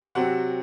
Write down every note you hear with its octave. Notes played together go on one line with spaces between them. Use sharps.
C3 F#3 C4 F#5